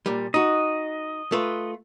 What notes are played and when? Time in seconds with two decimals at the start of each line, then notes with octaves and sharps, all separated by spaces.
0.06 A#2 G3
0.34 D#4 F#4 D#5
1.32 A3 F4 B4